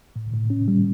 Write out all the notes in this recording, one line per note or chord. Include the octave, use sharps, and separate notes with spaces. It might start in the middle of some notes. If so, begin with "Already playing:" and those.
A2
A2
C#4
G3